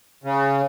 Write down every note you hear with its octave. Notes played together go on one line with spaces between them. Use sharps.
C#3